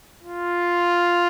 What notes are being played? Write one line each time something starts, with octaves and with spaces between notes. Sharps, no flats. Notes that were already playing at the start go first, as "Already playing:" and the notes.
F4